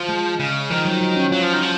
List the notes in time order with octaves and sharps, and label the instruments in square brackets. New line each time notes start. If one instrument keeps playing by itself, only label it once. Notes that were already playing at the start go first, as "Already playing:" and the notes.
Already playing: [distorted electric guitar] F3
[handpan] G#3
[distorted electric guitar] C#3
[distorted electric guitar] D#3 [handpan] F3
[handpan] F#3
F#3
C#4
[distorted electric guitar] F#3 [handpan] F4
[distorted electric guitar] F3
D#3
F3